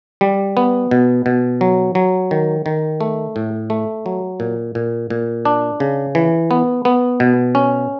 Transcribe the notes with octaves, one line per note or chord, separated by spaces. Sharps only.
G3
B3
B2
B2
F#3
F#3
D#3
D#3
A3
A2
A3
F#3
A#2
A#2
A#2
D4
C#3
E3
B3
B3
B2
C#4